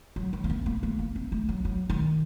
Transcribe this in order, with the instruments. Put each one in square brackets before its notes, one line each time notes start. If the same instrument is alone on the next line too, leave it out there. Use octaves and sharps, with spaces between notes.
[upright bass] F#3
D#3
A#3
C4
A#3
A3
A#3
C4
A3
F#3
F#3
D#3